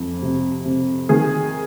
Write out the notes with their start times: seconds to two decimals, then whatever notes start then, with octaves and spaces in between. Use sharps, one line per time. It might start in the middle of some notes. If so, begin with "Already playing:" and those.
Already playing: F2
0.22 C3
0.66 C3
1.09 D#3 G#4